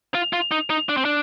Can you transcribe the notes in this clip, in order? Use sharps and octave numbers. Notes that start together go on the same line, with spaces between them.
F4
F4
D#4
D#4
D4
C4
D4